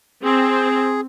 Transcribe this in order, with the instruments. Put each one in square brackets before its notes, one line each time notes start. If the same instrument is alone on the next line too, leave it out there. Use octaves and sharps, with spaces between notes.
[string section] C4 [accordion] G#4